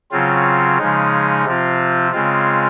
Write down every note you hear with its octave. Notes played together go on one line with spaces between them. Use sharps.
C#3 F#3 C4 F4
C#3 F3 G#3 D#4
C3 F3 C4 F4
C#3 G#3 C4 F4